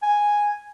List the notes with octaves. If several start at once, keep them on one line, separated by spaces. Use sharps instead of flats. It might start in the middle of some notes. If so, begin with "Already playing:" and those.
G#5